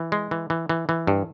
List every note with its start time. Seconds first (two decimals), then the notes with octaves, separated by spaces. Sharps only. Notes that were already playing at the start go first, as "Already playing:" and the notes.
Already playing: E3
0.12 G#3
0.31 E3
0.50 E3
0.69 E3
0.89 E3
1.07 G2